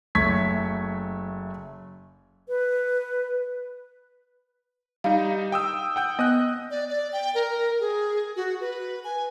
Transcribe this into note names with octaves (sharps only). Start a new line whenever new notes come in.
F#1 A3 C#6 G#6 B6
B4
G3 D#4 F5
G5 D#6 E6
F#5 G5 G6
B3 D#5 D#6 F#6
D5
D5
G5
A#4
G#4
F#4
B4
G#5